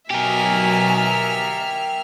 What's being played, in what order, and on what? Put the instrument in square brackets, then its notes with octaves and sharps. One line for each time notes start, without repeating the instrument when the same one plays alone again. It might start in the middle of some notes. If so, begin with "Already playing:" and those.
[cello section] B2 F#3 [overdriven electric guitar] G4 A#4 [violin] E5 F6 [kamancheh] G#5